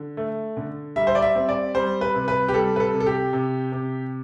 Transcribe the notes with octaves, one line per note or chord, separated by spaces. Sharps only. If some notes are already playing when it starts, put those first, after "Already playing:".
Already playing: D3
A3
D3
G3 E5
C5
D5
E5
C4
D5
G3 C5
B4
C3
B4
G4
G3 A4
B4
A4
C3
A4
G4
C3
C3